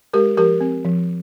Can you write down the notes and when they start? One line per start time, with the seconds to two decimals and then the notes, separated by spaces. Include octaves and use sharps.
0.13 G#3 G4 A#4
0.37 F3 G4 A#4
0.61 C4
0.85 F3